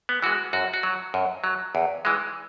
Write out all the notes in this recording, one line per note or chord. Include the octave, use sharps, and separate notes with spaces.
B3
E3 G#3 F#4
F#2 F#4
F#4
F#3
F#2
F#3
E2
E3 G#3